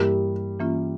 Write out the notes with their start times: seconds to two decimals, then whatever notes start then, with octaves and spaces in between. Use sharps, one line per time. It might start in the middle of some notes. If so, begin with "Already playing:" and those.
Already playing: G2 E3 G3 A#3 E4 A#4
0.60 E3 A#3 C#4 F4